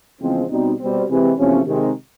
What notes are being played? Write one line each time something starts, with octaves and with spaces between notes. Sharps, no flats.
E2 C#3 F3 G#3 C4
B2 G3 C4 D#4
B2 G3 C4
C3 E3 G#3
E2 C3 F3 A3 C#4
C3 D#3 G#3